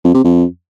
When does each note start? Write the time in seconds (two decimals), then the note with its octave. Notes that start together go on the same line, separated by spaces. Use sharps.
0.04 F2
0.14 C3
0.24 F2